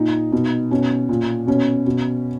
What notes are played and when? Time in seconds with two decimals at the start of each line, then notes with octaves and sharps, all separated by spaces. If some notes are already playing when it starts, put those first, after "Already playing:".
Already playing: A#2 D#4
0.32 B2
0.71 B2 C#4
1.09 A#2
1.47 B2 C#4
1.87 B2